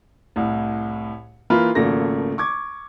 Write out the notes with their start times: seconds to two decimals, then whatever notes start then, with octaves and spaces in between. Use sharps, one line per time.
0.36 C2 A2
1.50 E3 A#3 F4 B4
1.75 G#1 C#3 F3 A3 A#3 A#6
2.38 C#6 D6 G#6